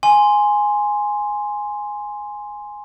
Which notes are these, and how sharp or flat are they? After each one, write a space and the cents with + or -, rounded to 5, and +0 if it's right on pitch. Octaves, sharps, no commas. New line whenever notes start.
G#5 +0 C6 +0